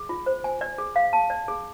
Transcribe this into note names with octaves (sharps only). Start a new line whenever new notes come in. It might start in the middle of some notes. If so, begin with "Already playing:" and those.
Already playing: G#4
F4
C5
G#5
D5
G#4
F5
A5
D5
G#4